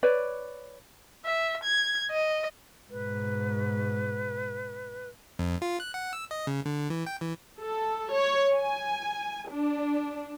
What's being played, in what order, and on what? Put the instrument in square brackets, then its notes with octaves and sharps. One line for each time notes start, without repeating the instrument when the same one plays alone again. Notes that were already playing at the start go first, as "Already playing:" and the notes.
[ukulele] B4 C#5 D5
[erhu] E5
G#6
D#5
[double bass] G#2 B2 [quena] B4
[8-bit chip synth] F2
F4
F#6
F#5
E6
D#5
C#3
D3
E3
G5
E3
[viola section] A4
C#5
G#5
D4